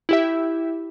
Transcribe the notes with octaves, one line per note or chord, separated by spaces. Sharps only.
E4 G4 E5